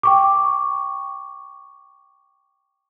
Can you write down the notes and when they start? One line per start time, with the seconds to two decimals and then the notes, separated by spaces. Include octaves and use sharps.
0.03 G5 C#6 D6